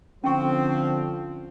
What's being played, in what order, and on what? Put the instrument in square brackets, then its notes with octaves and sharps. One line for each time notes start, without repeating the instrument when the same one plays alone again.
[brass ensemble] D3 F3 [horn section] C4 [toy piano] C#4 G5 C#6